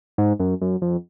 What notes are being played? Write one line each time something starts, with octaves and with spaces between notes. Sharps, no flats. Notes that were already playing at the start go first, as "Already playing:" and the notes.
G#2
F#2
F#2
F2